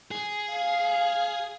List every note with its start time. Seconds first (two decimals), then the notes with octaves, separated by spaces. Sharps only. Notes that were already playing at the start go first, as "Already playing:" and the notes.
0.11 G#4
0.53 F5